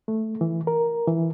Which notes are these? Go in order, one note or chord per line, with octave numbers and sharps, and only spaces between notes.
A3
E3
A#4
E3